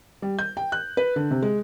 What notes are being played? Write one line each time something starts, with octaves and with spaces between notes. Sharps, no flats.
G3
G6
G5
F#6
B4
D3
C3
G#3